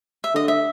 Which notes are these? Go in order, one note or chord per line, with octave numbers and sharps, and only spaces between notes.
E5
D3 D#5
E5